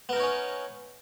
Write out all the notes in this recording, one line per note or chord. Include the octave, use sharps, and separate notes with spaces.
B3 C#4 D#4 A#4 C#5